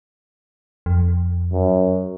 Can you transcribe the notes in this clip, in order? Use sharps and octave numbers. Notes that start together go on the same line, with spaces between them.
F2
F#2